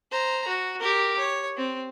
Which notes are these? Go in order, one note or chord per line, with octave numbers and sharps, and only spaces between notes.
C5 A#5
F#4
G4 A#4
C#5
C4